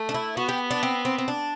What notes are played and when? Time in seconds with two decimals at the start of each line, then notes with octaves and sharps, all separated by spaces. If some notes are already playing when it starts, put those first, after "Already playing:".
Already playing: A3
0.09 D4
0.14 E4
0.37 B3 F#4
0.49 G4
0.71 D4
0.83 C4
1.05 C4
1.18 C4
1.28 D4